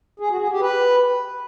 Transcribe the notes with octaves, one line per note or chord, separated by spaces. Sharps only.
G#4
F#4
G#4
G4
B4